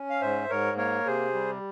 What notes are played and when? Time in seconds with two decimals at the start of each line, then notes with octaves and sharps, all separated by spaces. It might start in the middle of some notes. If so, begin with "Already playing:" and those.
Already playing: C#4
0.10 F5
0.21 G#2 C5 E5
0.50 G#2 A#4 C#5
0.77 A#3 A#4 C#5
1.06 C3 G#4 C5
1.34 G3